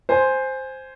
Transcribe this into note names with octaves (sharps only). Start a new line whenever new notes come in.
C5 G#5 C6